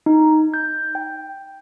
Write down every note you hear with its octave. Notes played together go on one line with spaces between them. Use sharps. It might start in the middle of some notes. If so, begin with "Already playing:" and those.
D#4
G6
G5